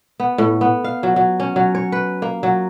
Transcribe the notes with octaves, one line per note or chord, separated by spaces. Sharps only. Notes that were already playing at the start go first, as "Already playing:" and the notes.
B3
A2
B3
F5
F#3
F#3
C#4
F#3
C#5
B4
A#3
F#3